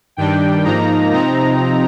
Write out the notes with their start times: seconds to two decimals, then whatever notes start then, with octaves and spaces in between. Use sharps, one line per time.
0.17 G2 D#3 G3 D4 G5
0.64 G#2 F3 A#3 D#4 A#5
1.12 C3 F3 C4 D#4 A#5